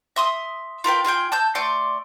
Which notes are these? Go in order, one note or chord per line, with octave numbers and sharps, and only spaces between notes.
E5 C6 D#6
F4 A#4 B4 G5
F4 G#4 F5 G5
A5 E6 G6
A3 D5 C6 D6